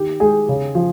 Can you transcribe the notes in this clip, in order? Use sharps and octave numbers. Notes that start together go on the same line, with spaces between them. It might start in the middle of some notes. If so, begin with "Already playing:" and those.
Already playing: D#3 G4
G#3 G#4
C#3
F3